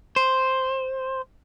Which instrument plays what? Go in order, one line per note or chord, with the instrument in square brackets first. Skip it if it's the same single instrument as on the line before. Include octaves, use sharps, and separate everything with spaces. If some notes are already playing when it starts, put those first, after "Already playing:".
[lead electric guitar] C5